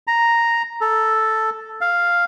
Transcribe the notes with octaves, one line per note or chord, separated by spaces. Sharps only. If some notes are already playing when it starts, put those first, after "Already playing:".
A#5
A4
F5